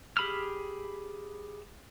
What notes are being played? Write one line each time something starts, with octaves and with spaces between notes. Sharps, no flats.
G4 G#4 B5 E6 F6